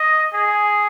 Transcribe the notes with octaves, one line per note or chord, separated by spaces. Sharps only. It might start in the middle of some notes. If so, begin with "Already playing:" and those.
Already playing: D#5
G#4